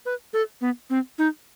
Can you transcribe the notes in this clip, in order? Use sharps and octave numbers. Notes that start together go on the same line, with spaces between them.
B4
A4
B3
C4
D#4